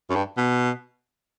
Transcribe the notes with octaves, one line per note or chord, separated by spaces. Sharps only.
F#2
G2
B2